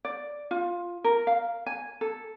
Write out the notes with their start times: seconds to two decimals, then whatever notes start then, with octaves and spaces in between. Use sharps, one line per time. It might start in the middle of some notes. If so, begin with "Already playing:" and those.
0.05 D5
0.51 F4
1.04 A#4
1.27 F5
1.66 G#5
2.01 A4